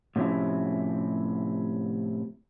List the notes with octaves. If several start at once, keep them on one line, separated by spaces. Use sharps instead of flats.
A2 C3 F3 C#4 E4